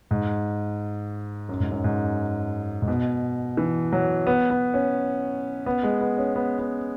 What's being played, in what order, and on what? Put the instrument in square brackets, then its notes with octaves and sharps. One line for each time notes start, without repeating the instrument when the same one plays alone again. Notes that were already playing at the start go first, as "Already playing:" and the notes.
[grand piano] G#2
F#2
G#2
F#2
G#2
G#2
B2
E3
F#3
B3
B3
C#4
B3
G#3
B3
C#4
B3
B3